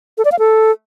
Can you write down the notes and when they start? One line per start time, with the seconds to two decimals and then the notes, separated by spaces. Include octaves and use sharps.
0.18 A4
0.25 D5
0.32 F5
0.39 A4